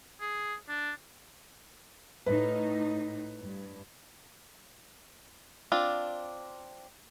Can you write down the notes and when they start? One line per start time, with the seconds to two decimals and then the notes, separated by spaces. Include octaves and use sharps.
0.21 G#4
0.69 D4
2.26 A2 D#4 B4
3.41 G2
5.72 C4 D4 F4